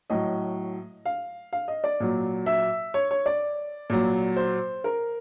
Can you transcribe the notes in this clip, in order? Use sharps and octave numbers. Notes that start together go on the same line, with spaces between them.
A2 F#3 D#5
F5
F5
D#5
D5
A#2 F#3
E5
C#5
C#5
D5
A#2 F#3
C5
A#4